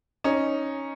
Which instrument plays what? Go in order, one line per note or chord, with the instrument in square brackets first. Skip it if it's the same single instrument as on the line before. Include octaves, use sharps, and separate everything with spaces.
[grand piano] C#4 D#4